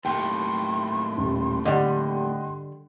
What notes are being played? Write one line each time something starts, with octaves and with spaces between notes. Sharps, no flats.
D#2 A2 G5 C6
D#1
D3 G3 D#5 F#5 G5